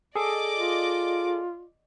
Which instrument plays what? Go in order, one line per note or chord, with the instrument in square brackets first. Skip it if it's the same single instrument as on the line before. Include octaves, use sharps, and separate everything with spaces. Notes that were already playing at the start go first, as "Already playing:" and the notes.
[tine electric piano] G#4 A4 [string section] D5 D#5 D6
[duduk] F4